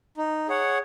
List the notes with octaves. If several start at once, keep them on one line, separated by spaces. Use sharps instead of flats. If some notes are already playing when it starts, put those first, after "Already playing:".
D#4
G#4 C#5 F#5